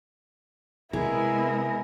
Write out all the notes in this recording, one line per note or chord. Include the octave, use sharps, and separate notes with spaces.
C3 G#3 B3 E4 G#4 A#4